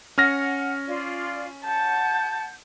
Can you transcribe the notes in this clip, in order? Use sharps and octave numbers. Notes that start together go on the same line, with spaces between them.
C#4 F#5 F6 A#6
F4 D5
F#5 A5 G6